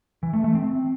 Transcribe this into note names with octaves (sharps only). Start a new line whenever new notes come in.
E3
A3
A3
C4